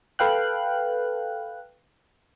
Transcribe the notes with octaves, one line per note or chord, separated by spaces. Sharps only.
A4 B4 F5 G5 F#6